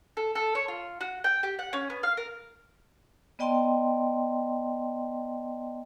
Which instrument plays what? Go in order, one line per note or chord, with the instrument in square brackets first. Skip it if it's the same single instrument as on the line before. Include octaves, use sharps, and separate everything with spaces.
[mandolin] A4
A4
C#5
F4
F#4
G5
G4
F#5
C#4
B3
F5
A#4
[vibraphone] B3 D5 D#5 G5 A5 C6